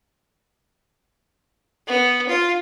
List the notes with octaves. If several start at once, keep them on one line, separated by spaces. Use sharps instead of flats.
B3
F4